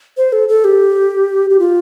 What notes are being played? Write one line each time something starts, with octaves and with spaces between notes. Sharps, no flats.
C5
A4
A4
G4
G4
F4